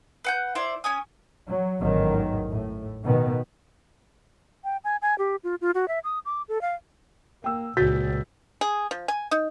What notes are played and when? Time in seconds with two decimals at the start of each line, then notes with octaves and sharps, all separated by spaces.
0.24 B4 F#5 G6
0.55 E4 C5 D5
0.84 C#4 G#5 D#6
1.47 F#3
1.80 A1 E2 G#2 D#3 F#3
2.51 A2
3.04 B2 D#3 B3
4.64 G5
4.84 G#5
5.02 G#5
5.18 G4
5.44 F4
5.61 F4
5.75 F#4
5.88 E5
6.04 D#6
6.25 D6
6.49 A4
6.62 F5
7.44 A#3 G5 E6
7.77 C#2 A#2 F#4 G6 A6 B6
8.61 G#4
8.91 F3
9.08 G#5
9.31 D#4